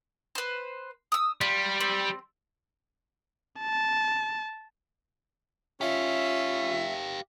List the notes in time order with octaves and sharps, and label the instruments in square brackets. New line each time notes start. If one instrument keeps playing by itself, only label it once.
[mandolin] B4 C5
D#6 E6
[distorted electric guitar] G3 [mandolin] F4
[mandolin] C4
[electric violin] A5
[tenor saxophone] C#4 [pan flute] F4 [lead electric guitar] G4 F5 [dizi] E5